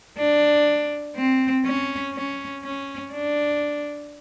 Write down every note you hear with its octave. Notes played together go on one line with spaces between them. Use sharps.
D4
C4
C#4
C#4
C#4
D4